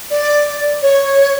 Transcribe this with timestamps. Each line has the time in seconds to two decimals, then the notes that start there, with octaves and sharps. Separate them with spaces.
0.11 D5
0.82 C#5